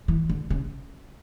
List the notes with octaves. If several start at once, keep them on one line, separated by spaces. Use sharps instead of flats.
E3
D3
C#3